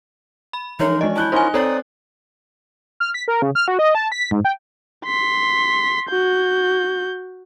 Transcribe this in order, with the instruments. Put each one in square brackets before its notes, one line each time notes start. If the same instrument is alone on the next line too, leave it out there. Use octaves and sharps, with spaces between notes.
[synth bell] B5
[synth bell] E3 F3 C#5 [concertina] G#3 A#4 [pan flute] D#4
[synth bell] G#3 D#5 [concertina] C#4 [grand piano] D4
[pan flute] E4 [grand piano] A5 F#6 G6
[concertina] C#4 F4 A#4 [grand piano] D#4 [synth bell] C5 G#5
[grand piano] C4 [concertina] D#4 D#6 [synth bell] A4 C#5 [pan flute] D5
[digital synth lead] F6
B6
A#4
C#3
F6
F#4
D#5
A5
B6
G#2
G5
[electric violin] C6 B6
F#4 G6